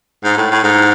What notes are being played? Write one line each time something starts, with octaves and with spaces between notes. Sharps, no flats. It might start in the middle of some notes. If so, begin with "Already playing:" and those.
G#2
A2
A2
G#2